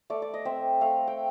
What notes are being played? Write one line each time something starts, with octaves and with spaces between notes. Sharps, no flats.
A3 D5
D5
D#5
C4 E5
A3 F5
G5